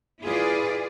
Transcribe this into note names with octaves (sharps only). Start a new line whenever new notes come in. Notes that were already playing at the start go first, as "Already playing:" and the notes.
E4 F4 G#4 B4 D5 F5